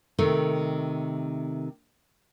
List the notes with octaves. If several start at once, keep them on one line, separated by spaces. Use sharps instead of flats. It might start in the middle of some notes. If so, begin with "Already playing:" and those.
C3 D#3 A3